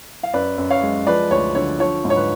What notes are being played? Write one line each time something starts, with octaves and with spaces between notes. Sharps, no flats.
F5
F#2 B4 D5
F#2
C#5 F5
G#3
F3 B4 D5
D2 C#5
D3 C#5
F3 C#5
G#2
C#5
B4